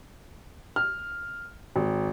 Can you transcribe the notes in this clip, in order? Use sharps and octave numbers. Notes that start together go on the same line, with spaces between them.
F6
G#1